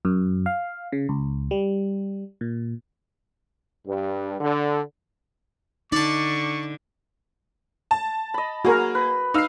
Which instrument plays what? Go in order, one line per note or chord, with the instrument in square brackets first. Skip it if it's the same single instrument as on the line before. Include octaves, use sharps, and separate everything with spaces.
[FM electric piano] F#2
F5
C#3
C#2
G3
A#2
[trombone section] G2
D3
[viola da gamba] D3 [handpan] D#4 [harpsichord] D5 A5 [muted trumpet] C#6
[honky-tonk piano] A5
[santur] D#5 B5
[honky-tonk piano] A#3 G#4 [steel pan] F#4 A#4
[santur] B4
[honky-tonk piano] D#4 C7 [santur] F5 E6